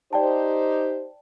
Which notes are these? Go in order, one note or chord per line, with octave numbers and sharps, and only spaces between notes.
D#4 G4 C5 D5 G5 A5